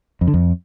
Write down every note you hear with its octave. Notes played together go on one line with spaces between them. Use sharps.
F2
D3
F2